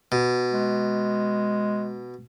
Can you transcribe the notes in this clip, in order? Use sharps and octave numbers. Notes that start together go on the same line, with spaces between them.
B2
G#3